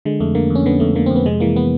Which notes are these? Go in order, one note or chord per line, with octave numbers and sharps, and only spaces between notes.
D3 G#3
F2 A3
D3 A#3
F2
C#4
D3 B3
F2 A3
D3 A#3
C4
F2
B3
C3 G#3
E3 A#3
B3